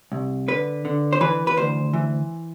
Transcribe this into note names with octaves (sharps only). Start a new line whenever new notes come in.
C2
D3 B4
D3
C5
E3 B4
B4
D2 C5
E3